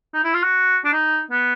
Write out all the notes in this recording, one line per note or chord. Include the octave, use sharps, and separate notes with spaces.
D#4
E4
F4
F#4
D4
D#4
B3